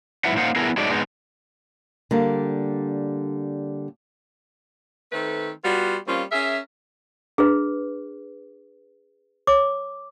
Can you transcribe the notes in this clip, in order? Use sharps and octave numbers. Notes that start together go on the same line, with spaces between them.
G#2 F#3 E4 B4 E5 F#5
A#3 D#4 C5 F5 F#5
B3 E4 G#4 A#4
F#3 G#3 A3 D#4 D5
G#3 B3 D#4
D3 G3 A#3
D#3 A3 C4 A4 B4
G3 B3 F4 F#4
G3 A#3 C4 C#4 F4
C#4 G#4 A#4 E5
D4 G#4 B4
C#5 D6